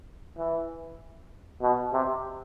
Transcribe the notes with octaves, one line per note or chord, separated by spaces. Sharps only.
E3
B2
C3